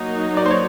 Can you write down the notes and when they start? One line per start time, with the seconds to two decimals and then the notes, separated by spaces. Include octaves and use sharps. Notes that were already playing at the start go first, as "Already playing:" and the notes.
Already playing: F#3 A#3 D#4 F#4
0.37 D5
0.46 C5
0.51 C#5